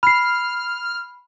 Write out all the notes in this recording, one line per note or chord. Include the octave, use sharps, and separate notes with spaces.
B5 F6 C7